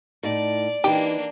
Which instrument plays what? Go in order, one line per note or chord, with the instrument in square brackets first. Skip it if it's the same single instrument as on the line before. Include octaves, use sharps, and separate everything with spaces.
[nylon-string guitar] A2 D#4 [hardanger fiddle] D5
[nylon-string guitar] E3 D#4 [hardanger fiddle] A#3 D4 [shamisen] G4